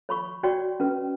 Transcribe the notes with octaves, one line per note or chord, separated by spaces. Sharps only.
C#5 B5 C#6
F#4 C#5 D5 G5
C#4 B4